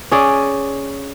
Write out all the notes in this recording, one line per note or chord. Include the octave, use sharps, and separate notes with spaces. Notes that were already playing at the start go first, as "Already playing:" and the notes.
C#4 G#4 D5